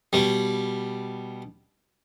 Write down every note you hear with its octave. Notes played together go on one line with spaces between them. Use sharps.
B2 G3